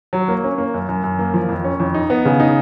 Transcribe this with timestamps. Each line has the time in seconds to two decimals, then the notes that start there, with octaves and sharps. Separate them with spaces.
0.13 F#3
0.28 A#3
0.44 C#4
0.58 A#3
0.74 F#2
0.89 F#2
1.04 F#2
1.19 A#3
1.34 F3
1.49 F2
1.64 C#4
1.80 F2
1.94 D#4
2.10 B3
2.25 C#3
2.40 D#4